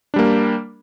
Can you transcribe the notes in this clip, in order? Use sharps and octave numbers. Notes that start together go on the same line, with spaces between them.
G3 A#3 D4